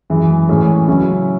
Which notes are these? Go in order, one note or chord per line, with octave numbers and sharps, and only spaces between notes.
F#2 E3 G#3
A2 E3 G#3 C#4
C#3 F#3 C#4 E4